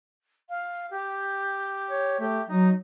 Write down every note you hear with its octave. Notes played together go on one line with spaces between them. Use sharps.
F5
G4
C#5
A3 G4
F#3 D#4